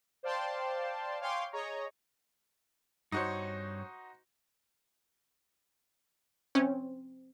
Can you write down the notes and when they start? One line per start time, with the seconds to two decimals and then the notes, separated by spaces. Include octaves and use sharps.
0.23 C5 D5 F5 G5 A5 C6
1.21 C#5 F5 G5 G#5 C6 D6
1.52 G#4 C#5 D#5 A#5
3.12 G2 D#4 F#4 C5 C#5
6.55 C4 C#4